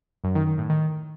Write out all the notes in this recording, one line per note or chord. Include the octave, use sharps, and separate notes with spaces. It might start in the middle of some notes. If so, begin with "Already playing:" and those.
F#2
D#3
D#3
A2
D#3